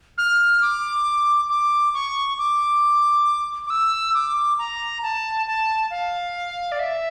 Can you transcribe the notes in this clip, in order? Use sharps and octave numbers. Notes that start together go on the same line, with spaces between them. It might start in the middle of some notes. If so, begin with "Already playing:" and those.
F6
D6
D6
C#6
D6
D6
E6
D6
A#5
A5
A5
F5
D5
E5